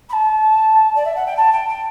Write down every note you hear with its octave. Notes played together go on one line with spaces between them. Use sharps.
B5
A5
D5
E5
F#5
G5
A5
G5
G5